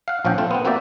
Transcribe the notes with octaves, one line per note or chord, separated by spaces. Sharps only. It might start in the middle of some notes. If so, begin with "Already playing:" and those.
F5 F#5
A#1 F3 C#4 F#5 G5
A3 C4 F4
B3 C4
A#3 C4 F#4 G4 D5 E5